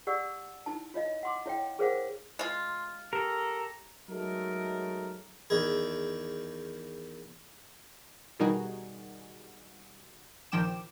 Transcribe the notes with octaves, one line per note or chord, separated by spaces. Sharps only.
G4 D5 F#5 E6
D#4 E4 A5
F4 C#5 D#5 F5
F#5 C6 D6
E4 C#5 F5 G5
G#4 A#4 C5 C#5 F5 F#5
G#3 F4
G4 A4 A#4 A#5
F#3 G#3 A3 D#4 A4 A#4
E2 D#3 G#4
B2 D#3 G3 D#4 F#4 G#4
A#1 D#3 F3 G5 D6 E7